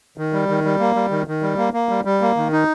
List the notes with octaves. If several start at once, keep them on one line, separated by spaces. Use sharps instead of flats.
D#3
G3
D#3
G3
A#3
G3
D#3
D#3
G3
A#3
A#3
G3
G3
A#3
D#3
D#4